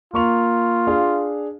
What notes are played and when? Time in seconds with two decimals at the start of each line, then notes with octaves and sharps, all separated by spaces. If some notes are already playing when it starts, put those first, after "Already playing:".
0.14 A#3 F4 C#6 F7
0.87 D4 G#4 F5